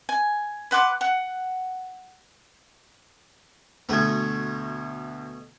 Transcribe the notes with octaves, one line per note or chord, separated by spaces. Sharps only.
G#5
B4 F#5 C6 D6
F#5
D2 B2 A3 B3 G#6